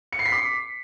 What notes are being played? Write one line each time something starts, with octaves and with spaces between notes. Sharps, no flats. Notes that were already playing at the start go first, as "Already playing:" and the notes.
C#7
C7
B6
D6